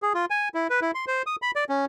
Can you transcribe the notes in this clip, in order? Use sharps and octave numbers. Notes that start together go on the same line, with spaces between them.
G#4
F4
G#5
E4
B4
E4
C6
C5
D#6
B5
D5
C#4